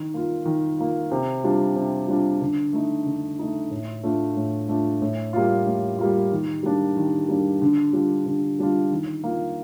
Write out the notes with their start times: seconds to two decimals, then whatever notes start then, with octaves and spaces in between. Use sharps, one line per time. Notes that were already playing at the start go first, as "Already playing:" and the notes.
Already playing: D#3
0.14 A#3 F4
0.45 D#3
0.78 A#3 F4
1.12 C3
1.44 G3 D4 F4
1.76 C3
2.08 G3 D4 F4
2.41 D3
2.73 A3 D#4
3.06 D3
3.39 A3 D#4
3.71 A2
4.03 A3 D4 F4
4.37 A2
4.68 A3 D4 F4
5.02 A2
5.33 G3 A#3 F4
5.66 A2
5.99 G3 A#3 F4
6.31 D#3
6.63 G3 A#3 D4
6.97 D#3
7.29 G3 A#3 D4
7.62 D3
7.93 G3 D4 F4
8.26 D3
8.59 G3 D4 F4
8.91 D#3
9.24 A#3 F4